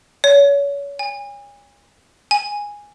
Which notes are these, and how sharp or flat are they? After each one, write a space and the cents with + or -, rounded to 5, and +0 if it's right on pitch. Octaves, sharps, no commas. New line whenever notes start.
C#5 +30
G#5 -35
G#5 -10